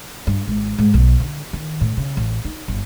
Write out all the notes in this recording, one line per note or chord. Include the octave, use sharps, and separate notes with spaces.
G2
G#1
G#2
B1
D3
D#3
A2
C#3
A1
D#4
G1